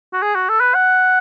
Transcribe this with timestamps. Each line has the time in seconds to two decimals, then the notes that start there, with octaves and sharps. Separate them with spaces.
0.13 F#4
0.23 G#4
0.35 F#4
0.49 A4
0.61 B4
0.74 F#5